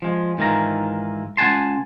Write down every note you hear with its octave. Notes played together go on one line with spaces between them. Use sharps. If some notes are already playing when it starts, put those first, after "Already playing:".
F3 G#3
G#2 D#3 E3 F4 A#5
C#2 F#5 G#5 A5 C6